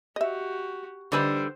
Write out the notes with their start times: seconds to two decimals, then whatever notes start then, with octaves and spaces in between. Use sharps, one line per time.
0.16 F#4 G4 D#5 E5
1.12 D3 E3 G3 D#4 B4 C5